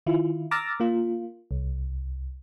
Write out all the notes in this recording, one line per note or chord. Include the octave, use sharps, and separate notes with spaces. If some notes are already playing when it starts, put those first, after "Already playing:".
D#3 E4 F4
A#5 D6 E6 F6 A6 A#6
A#3 F4
C2